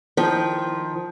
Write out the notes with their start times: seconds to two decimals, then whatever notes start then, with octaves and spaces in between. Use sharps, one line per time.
0.17 D#3 F3